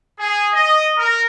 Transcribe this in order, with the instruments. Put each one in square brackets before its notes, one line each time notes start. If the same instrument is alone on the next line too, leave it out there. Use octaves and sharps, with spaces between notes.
[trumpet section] G#4
D#5
A#4